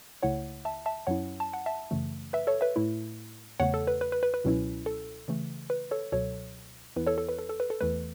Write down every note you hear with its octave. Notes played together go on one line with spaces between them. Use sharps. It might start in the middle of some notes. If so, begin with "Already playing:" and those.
C#2 C#3 A3 E4 C#5 F#5
E5 A5
E5 A5
F#2 F#3 C#4 E4 C#5 F#5
A5
F#5
E5 A5
F#2 C#3 E3 A3
B4 E5
A4 C#5
B4 E5
A2 A3 E4
E2 C#3 A3 C#5 F#5
A4
B4
B4
B4
B4
B4
C#2 B2 F#3 C#4 E4
A4
C#3 E3 A3
B4
A4 C#5
C#2 B2 F#3 A4 C#5
E2 E3 B3 E4 B4
A4 C#5
A4
B4
A4
A4
B4
A4
E2 E3 A3 B4